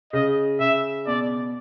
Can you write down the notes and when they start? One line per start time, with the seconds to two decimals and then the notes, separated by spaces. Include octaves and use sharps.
0.13 C#3 D#5
0.60 C#3 E5
1.06 B2 D5